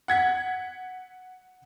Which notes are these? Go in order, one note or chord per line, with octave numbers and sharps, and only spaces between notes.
F#5 G#6 B6